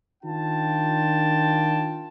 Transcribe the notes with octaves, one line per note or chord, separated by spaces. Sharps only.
D#3 D4 F4 G5 A5